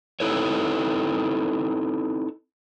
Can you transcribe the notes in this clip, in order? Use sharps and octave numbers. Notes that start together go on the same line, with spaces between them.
C4 D#4 E4 A4 B4 C#5